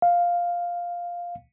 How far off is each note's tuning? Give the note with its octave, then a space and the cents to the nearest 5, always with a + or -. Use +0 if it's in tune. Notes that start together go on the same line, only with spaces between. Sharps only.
F5 +5